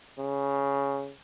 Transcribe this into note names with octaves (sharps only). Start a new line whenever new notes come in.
C#3